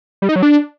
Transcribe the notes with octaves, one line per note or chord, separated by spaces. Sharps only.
G3
D#4
F#3
D4